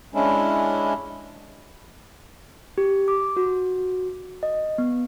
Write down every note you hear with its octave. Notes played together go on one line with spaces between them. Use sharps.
G#3 C#4 D4 E4
G4
D6
F#4
D#5
B3